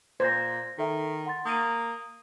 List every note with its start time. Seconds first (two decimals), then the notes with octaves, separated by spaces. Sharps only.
0.20 A#2 C5 G#6 A#6
0.78 D#3 A4 E5 G5
1.26 F#5 C6 A6
1.45 A#3 D#6 D#7